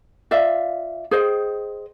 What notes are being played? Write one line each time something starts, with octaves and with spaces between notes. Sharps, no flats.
F4 D5 E5 F5
G#4 C5 D#5 G5